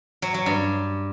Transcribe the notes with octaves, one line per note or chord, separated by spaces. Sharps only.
F#3
F#3
G2